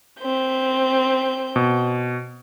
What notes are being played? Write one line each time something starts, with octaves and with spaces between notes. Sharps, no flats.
C4 G6
B2